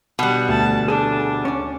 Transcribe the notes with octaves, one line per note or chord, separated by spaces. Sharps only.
B2 G3 F#5
D2 A5
D4 G#4 A4
C#4 D5